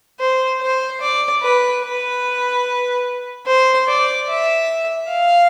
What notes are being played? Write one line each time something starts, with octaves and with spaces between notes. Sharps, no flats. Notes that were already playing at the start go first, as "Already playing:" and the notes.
C5
C5
D5
B4
B4
C5
D5
E5
F5